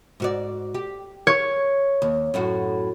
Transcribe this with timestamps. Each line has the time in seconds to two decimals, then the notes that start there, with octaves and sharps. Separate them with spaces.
0.20 G#2 F#4 D5
0.75 G4
1.27 C#5
2.02 D#2
2.34 F#2 A2 F#4